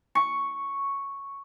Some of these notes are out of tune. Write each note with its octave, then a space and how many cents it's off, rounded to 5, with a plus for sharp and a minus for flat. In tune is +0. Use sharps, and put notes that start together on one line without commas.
C#6 +0